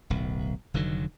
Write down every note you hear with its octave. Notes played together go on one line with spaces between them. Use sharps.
D1 B1
F1 D3 D#3 F#3